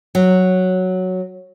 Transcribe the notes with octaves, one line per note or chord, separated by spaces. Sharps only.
F#3